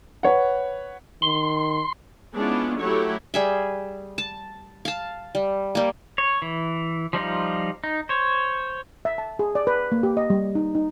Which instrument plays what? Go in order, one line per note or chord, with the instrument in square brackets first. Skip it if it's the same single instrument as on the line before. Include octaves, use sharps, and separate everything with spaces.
[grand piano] B4 C#5 F#5
[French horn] D#3 [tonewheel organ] C6
[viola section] G#3 B3 C#4 D4 E4 F4
F#3 A3 E4 G4 C#5
[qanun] G3 G#4 E5
A5
F5 A5
G3
G3 A#3
[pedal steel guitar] C#5
E3
F3 G3 D#4 F4
D#4
C5 C#5
[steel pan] E5
A5
G#4
D5
B4
A#3
G4
D#5
G3
D#4
D#4